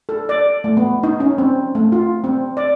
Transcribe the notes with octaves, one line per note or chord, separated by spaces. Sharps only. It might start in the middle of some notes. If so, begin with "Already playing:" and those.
A4
D5
A3
B3
D#4
C#4
C4
A3
F4
C4
D5